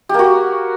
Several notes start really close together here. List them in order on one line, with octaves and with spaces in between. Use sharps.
G4 A#3 F#4